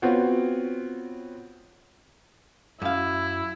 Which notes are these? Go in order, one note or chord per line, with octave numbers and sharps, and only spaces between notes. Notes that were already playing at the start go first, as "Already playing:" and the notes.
B3 C4 F4 F#4 C#5
F#2 E4 F5